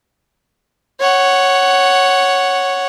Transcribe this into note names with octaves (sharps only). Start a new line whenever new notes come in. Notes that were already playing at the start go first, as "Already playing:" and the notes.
C#5 F#5